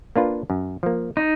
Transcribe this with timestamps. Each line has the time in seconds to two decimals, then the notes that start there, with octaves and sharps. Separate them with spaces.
0.16 A#3 D4 F4 B4
0.50 F#2
0.83 F3 A#3
1.17 D#4